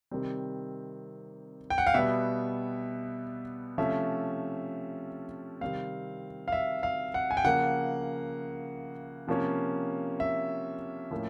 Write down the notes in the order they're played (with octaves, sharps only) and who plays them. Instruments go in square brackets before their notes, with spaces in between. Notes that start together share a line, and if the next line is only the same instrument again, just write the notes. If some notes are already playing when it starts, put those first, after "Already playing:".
[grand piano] C3 D#3 G3 C4
G5
F#5
F5
B2 G3 B3 E5
C3 F3 A3 C#4 E5
C3 D#3 G3 C4 F5
F5
E5
F5
F#5
G#5
G5
C#3 F3 A#3 F#5
C3 F3 A#3 C#4
E5
A2 F3 A#3 C#4